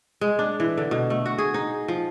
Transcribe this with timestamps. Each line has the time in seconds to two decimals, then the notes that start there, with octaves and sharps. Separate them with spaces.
0.21 G#3
0.39 D4
0.60 E3
0.78 D3
0.91 B2
1.10 A3
1.26 F#4
1.38 G#4
1.54 D#4
1.88 F3